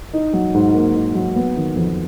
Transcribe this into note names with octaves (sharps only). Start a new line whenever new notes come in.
D#4
F#3
G#2
A#3
D#4
F#3
B3
D#3
F2